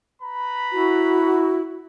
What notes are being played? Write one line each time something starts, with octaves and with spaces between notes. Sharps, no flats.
B4 A#5 B5
E4 F#4